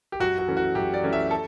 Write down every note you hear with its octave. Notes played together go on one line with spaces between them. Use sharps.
G4
F#2 F#4
F#4
E3 A3 C#4
F#4
F#2 G4
D5
E3 A3 C#4
E5
A4